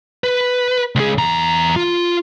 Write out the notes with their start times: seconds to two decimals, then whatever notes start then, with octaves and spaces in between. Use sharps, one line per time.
0.24 B4
0.95 C#2 G#4
1.18 E2 A#5
1.76 F4